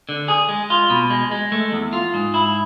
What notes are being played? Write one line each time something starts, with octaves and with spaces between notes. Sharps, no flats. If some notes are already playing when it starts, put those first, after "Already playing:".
D3
G#4
G#3
F4
B2
G#3
G#3
A3
E2
F4
G#2
E4